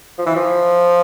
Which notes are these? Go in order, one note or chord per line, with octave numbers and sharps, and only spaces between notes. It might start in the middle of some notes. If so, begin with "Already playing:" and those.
F3
E3
F3